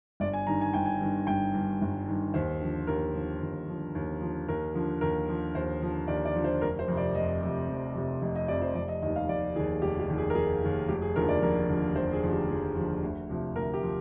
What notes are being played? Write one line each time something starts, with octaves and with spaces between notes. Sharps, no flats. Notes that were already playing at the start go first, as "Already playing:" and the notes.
G1 D5
G#5
G2 D#3 A#5
G#5
G1 G5
G#5
G2 D#3
G1 G5
G2 D#3
G1
G2 D#3
D#2 C5
D3 F3
D#2 A#4
D3 F3
D#2
D3 F3
D#2
D3 F3
D#2 A#4
D3 F3
D#2 A#4
D3 F3
D#2 C5
D3 F3
D#2 D5
D5
D3 F3
C5
F1 A#4
C5
F2 C3
D5
F1 D#5
F2 C3
F1
F2 C3
F1 D#5
D#5
F2 C3 D5
C5
F1 D5
D#5
D#2 D#3 D#5
F5
F1 D5
D#2 D#3 G#4
F1 G4
G4
D#2 D#3
G#4
A#4
F1 G#4
D#2 D#3
F1 G4
G#4
D#2 D3 F3 A#4
D5
F1 A#4
D#2 D3 F3
F1 C5
G#4
D#2 D3 F3
G4
F1 G#4
D#2 D3 F3
D2
C3 F3
D2 A#4
G4
F3